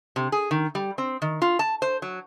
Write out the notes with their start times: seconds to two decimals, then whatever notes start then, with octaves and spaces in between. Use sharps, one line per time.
0.16 C3
0.32 G#4
0.51 D#3
0.75 G3
0.98 C4
1.22 D#3
1.42 F4
1.59 A5
1.82 C5
2.02 F#3